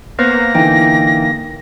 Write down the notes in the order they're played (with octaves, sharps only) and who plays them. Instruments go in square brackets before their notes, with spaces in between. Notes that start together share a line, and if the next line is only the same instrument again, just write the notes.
[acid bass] A#3 [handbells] B3 B4 C5 [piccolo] A#6
[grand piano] D3 E3 D#4 [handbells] G5